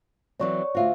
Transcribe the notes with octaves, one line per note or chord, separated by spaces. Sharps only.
E3 F#3 C4 C#5 D5 C#6
D2 F4 F#4 C5 E5